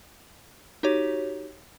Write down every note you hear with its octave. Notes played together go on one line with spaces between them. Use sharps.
D#4 F#4 G4 C#5